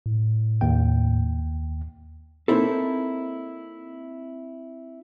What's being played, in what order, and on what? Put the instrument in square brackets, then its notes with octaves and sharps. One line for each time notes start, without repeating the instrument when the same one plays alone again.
[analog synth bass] A2
[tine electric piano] D#2 G5
[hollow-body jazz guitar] A#3 C4 D#4 E4 A4